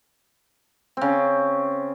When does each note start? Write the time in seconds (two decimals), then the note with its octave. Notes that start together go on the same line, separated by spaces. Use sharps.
0.97 C#3 C4